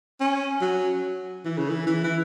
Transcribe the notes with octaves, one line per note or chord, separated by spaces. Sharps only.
C#4
F#3
E3
C#3
E3
E3
E3